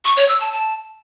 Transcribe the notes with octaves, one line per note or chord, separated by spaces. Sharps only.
C#6
C#5
E6
A5
A5